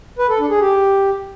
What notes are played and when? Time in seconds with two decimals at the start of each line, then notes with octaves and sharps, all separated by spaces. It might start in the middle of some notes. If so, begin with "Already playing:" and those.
0.19 B4
0.29 A4
0.39 D4
0.50 G#4
0.60 G4